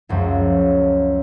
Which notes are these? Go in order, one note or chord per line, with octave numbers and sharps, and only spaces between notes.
C#2 F#2 F3